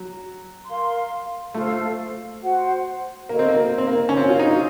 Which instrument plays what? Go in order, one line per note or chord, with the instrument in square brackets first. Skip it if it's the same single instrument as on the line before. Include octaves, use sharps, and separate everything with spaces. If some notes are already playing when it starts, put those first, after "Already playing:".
Already playing: [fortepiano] F#3
[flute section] A#4 F5 C6
[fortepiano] A3 [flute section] F4 A4 C5 F5
[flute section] F#4 C5 F#5
[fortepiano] A#3 [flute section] F#4 A4 D#5
[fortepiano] C4
A#3
C4
A#3
C#4
[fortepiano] C4 [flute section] F#4 A#4 C#5 F5
[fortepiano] F4
D#4